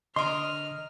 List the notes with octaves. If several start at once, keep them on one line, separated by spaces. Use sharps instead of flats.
D3 A#4 D#5 C6 F6